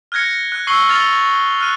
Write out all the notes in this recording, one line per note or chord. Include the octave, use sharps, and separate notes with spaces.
F6 F#6 G#6 A#6 C#7
C#7
F#6
C#6 E6 C7 F#7 G7
F6 A6 F7 G7
F6 F#6 D#7